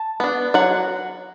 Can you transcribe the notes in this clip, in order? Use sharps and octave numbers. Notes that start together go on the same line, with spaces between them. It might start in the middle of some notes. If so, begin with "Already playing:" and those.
Already playing: A5
B3 D4
F#3 F#5